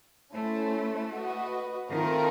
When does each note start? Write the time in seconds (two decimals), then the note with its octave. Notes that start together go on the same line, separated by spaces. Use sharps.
0.33 A3 C#4 E4 A4 C5
1.13 F#4 B4 D#5
1.92 D#3 A3 C4 F4 A#4